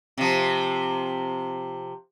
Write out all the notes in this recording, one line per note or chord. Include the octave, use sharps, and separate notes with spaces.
C3 F3